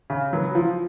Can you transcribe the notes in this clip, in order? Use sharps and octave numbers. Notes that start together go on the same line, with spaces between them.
C#3
F#3 B3
F3